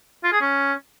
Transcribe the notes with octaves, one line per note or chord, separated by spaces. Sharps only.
F4
G#4
C#4